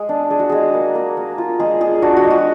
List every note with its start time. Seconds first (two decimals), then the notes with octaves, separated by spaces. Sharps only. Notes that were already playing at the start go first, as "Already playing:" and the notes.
Already playing: G#3 G#4
0.09 D4
0.30 D4 G#4
0.39 F#4
0.49 G#3 G#4
0.74 A#3
0.95 A#3
1.17 A#3
1.38 F4
1.60 G#3 G#4
1.81 G#3 G#4
2.02 D4 F#4
2.17 F#4
2.24 G#3
2.30 F#4